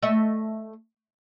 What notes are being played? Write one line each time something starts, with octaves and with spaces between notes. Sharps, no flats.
A3 D#5 E5